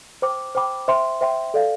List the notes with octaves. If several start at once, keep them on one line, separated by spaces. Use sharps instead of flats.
C5 G5 B5 D6
C5 G5 B5 D6
C5 E5 G5 C6
C5 E5 G5 C6
A4 D5 F5